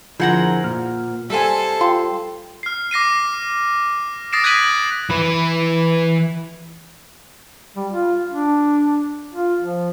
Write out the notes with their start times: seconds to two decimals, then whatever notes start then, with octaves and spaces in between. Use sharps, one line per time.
0.20 D3 F3 E4 G#4 A#4 C5 F#5 A#5
0.64 A#2 F6
1.30 G3 A4 C5 E5 G#5
1.81 F4 G5 C6
2.63 F6 C7
2.91 D6 A#6 C7 D#7
4.32 D#6 A6 A#6 C7 D7 E7
4.44 F#6 G#6 A#6 B6 D#7 F#7
5.10 E3 B4
7.76 G3
7.91 F4
8.30 D4
9.34 F4
9.61 F3